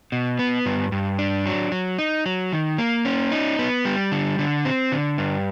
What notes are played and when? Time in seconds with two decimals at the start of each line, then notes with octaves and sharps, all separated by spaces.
0.12 B2
0.39 B3
0.66 G2
0.92 G2
1.19 D4
1.46 F#3
1.72 F#3
1.98 D#4
2.26 F#3
2.53 D#3
2.78 A#3
3.05 C#4
3.32 D#4
3.59 B3
3.85 G3
4.12 D3
4.39 D3
4.65 C4
4.92 D3
5.18 G2